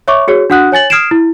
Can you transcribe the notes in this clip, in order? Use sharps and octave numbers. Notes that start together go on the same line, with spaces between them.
C#5 E5 C#6 D6
F#4 G#4 C#5
D4 F#4 F#5 D#6 F#6
C#5 G#5 A6 F#7
D#6 F6 G#6 C7 D7 E7
E4